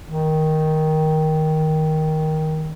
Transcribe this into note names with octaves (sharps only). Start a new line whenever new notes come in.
D#3